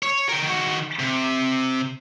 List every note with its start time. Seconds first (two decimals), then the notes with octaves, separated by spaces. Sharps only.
0.03 C#5
0.29 A#4 G5
0.42 D#3 F#4
0.99 C3